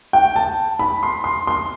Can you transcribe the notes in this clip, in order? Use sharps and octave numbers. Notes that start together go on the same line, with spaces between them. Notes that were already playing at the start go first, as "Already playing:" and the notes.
G5
A5
B5
C6
C6
C6